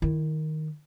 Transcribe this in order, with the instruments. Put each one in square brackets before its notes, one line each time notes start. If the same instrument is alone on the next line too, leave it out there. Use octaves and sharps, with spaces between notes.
[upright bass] D#3 E4